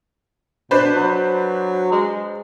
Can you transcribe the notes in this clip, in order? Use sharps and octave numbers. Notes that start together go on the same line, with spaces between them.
B2 D4 B4 C5
F#3
G#3